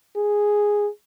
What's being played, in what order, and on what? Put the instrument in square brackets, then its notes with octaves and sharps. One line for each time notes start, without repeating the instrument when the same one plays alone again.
[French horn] G#4